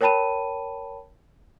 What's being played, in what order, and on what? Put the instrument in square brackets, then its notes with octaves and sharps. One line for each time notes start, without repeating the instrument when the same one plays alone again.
[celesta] A#4 C#5 G5 A5 B5 D#7